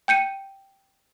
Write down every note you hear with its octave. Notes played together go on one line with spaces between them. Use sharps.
G5 G6 C#7 D#7